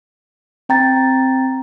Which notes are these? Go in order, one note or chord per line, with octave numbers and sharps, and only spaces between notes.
C4 G5 A#5 A6